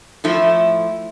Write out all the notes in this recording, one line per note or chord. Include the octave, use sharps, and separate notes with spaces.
A2 F3 A3 E4